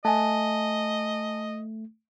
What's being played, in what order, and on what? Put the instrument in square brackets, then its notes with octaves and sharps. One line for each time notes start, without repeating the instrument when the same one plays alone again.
[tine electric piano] A3 [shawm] D#5 [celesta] G#5 A5